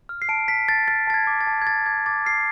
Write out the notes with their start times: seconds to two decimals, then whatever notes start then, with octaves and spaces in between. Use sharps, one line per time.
0.09 F6
0.22 C7
0.29 A5 D7
0.48 A5 B6
0.69 A5 A6
0.88 F6 A6
1.07 A5 A6
1.14 G#6
1.27 D6
1.41 A6
1.47 A5
1.62 G#6
1.67 D6 A6
1.86 D6 G#6
2.06 D6 A6
2.25 F6 C7